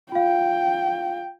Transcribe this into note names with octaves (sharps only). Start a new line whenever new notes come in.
F4 F5 G5